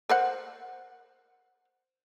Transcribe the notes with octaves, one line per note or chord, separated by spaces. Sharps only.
A#4 C5 F#5